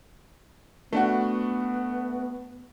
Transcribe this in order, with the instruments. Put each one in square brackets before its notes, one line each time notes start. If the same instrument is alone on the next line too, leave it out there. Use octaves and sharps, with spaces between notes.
[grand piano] A3 D4 F#4 [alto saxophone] B3